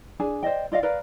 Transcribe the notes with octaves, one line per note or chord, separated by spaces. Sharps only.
D4 G#4 G#5
C5 D5 D#5 G5
F4 D5 D#5 F5
A#4 B4 D5 F5